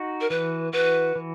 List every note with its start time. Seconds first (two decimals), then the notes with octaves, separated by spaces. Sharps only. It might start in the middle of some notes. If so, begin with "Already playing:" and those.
Already playing: D#4 F#4
0.21 A#4
0.30 E3 B4
0.72 F#4 B4
1.16 E3